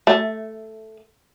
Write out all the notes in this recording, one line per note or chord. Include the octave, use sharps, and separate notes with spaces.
A3